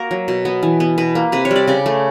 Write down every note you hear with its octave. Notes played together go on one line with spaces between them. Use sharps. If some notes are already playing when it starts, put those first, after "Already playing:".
Already playing: A#3 F#4 A#4
F#3
B2
B3
E3
B3
B2 B4
A#3
C3 B4
C#5
G3
D5
C#3 D5
A3